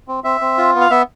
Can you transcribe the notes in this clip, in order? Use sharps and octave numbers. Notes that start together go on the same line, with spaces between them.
C4
C4 E5
C4
F4
B3
F5
B3 E5